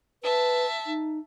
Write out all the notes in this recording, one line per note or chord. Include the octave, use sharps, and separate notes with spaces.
B4 E5 A5
D#4